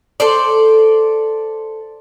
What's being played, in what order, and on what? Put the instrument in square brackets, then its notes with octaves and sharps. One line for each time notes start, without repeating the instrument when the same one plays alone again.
[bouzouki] A4 C5 D5